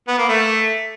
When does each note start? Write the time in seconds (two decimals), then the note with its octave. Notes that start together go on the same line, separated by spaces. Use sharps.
0.08 B3
0.18 A#3
0.29 A3